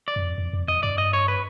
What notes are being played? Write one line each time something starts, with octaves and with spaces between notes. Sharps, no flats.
D5
F#2
F2
F2
F2
F2 D#5
G2 D5
D#5
C#5
B4